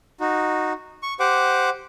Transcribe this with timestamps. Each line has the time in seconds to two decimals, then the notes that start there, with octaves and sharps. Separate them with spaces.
0.20 D#4 F#4
1.03 C#6
1.20 G4 C5 F#5 D6